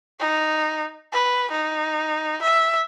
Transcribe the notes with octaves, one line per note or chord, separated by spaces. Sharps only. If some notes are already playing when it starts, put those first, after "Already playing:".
D#4
B4
D#4
E5